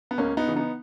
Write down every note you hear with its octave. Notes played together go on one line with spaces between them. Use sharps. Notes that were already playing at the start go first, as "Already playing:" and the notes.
B3
C#2 A#3 C#4
B3 D#4
C#3 E3
B3 D#4